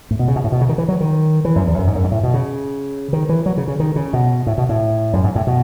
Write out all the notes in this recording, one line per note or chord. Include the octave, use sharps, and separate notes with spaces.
A2
B2
C#3
B2
A2
B2
C#3
D#3
E3
F#3
D#3
E3
F#2
E2
F#2
G#2
F#2
G#2
A2
B2
C#3
D#3
E3
F#3
C#3
C#3
D#3
C#3
B2
A2
B2
A2
F#2
G#2
A2
B2